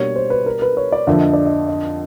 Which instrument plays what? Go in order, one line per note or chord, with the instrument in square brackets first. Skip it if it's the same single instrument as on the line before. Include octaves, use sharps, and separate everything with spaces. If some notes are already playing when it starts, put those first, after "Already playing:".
Already playing: [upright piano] B2 G3 A#3 D4 [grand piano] C#5
[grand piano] C5
B4
A#4
B4
C#5
D5
[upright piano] F2 D3 F3 A#3 [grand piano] E5
[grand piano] D#5
D5
D#5
D#5